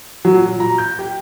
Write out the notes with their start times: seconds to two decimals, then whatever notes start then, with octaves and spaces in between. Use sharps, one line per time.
0.25 F#3
0.36 A#2
0.60 A#5
0.78 G6
0.99 G4